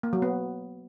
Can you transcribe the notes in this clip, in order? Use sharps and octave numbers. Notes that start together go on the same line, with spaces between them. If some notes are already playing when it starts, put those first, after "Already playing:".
A#3
F#3
B3